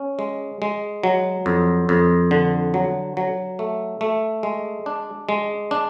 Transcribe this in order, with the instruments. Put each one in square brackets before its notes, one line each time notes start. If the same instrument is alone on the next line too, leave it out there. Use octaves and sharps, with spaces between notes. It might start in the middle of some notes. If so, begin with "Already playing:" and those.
Already playing: [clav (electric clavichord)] C#4
G#3
G#3
F#3
F2
F2
D3
F#3
F#3
A3
A3
G#3
D4
G#3
D4